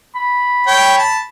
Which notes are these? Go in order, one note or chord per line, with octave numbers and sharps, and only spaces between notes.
B5
C#5 G5
A5